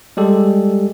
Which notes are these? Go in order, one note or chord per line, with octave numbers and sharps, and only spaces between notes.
G3 G#3 G4 A4